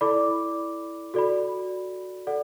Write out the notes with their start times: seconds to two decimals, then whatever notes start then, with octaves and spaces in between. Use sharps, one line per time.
0.01 E4 A4 D5 B5 D6
1.14 F#4 A4 D5 B5
2.27 A4 D5 F#5